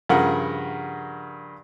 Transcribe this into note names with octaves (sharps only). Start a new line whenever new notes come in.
G2 C#3 F3 A#4 F#5